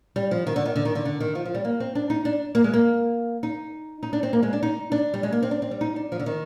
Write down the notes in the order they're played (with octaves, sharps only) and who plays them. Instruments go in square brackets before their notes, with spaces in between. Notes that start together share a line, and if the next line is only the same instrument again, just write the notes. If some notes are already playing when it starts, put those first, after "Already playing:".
[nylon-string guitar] G3
F3
D#3
D3
D#3
D3
D#3
D3
D3
D#3
F3
F3
G3
A#3
C4
D4
D#4
D4
A#3
G#3
A#3
D#4
D#4
D4
C4
A#3
G#3
D4
D#4
D4
G3
G#3
A#3
C4
D4
C4
G3
D#4
D4
F3
D3
D#3